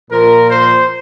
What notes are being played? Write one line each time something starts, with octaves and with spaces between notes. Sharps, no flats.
A#2 F3 A#4
C5